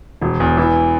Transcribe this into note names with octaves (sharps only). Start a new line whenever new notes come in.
E1
E2
E3